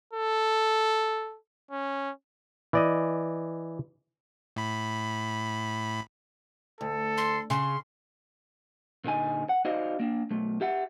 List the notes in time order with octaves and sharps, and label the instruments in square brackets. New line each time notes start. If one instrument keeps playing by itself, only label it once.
[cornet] A4
C#4
[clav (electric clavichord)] E3 D5 D#5
[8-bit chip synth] A2 B5
[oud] D2 [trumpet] A4
[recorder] C6
[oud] C#3 [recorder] C6
[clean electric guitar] A#2 D3 D#4 G#5
F#5
D#4 F#4 C5 D5 D#5 F5
A#3 D4
B1 A3
G4 E5 F#5